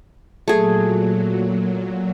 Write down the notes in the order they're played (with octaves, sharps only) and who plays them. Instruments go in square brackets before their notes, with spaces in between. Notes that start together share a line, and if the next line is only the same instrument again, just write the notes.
[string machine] A#2 F#3 [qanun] A3 G#4